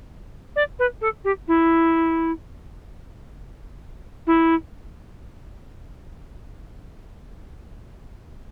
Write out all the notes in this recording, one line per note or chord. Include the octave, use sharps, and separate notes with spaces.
D5
B4
A4
G4
E4
E4